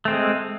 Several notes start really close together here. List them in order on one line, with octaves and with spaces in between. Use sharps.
A3 C4 G#3